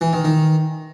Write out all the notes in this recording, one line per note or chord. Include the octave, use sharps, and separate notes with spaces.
E3
D#3
D#3